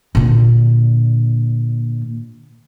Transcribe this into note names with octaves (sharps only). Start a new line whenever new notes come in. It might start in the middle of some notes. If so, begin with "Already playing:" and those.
A#2 D3